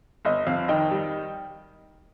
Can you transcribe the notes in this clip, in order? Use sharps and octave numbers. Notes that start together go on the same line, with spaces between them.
G1 D#5
F2 F5
D#3 D#5 G5
G3